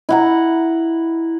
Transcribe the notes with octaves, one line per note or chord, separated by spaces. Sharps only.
E4 F#5 A#5